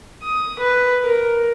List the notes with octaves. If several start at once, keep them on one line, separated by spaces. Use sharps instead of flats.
D#6
B4
A#4